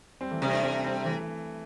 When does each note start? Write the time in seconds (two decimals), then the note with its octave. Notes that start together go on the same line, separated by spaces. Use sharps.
0.21 G3 C4
0.31 E3 A3
0.42 C3 G3 C4
0.53 A3 D4
0.63 G3 C4
0.84 G3 C4
1.05 E3 A3